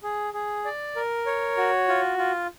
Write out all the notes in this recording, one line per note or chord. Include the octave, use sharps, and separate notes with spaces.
G#4
G#4
D5
A#4
C#5
F#4
F4
F4